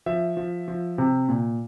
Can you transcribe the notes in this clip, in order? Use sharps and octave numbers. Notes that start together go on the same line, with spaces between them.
F3 E5
F3
F3
C3
A#2